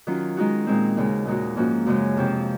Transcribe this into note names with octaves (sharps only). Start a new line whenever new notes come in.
D#3 F#3 C#4 F4
D#3 G#3 D#4 F#4
A#2 G#3 C4
D#2 C#3 G#3
A#2 G#3 D#4 F#4
G#2 F3 A#3 C#4 F#4
F#2 C#3 F3 G#3 C#4
F2 C3 F3 C4